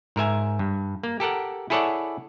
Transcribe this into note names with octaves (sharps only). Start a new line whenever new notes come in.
G#2 A#4 E5 G#5
G2
A#3
G4 A4 A#4 F#5
E4 G#4 A4 C#5 D5 F#5